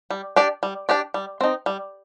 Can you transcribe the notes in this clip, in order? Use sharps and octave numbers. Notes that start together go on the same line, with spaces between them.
G3
D4 G4 D5
G3
D4 G4 D5
G3
C4 D#4
G3